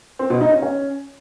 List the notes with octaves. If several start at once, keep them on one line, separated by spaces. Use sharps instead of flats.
C4
B2
D#4
C#4
C#4